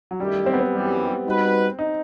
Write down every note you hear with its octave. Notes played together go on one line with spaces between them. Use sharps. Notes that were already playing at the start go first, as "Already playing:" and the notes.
F#3
F#2 D#3 G3 A3 E4 G4
C4
B3
C4
F#2 E3 G3
G3 D#4 F#4 B4
D#4